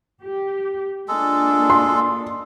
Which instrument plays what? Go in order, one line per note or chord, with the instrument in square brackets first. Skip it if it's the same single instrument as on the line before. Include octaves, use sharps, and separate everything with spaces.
[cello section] G4
[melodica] G#3 A4 [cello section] A#3 D4 F4
[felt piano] C6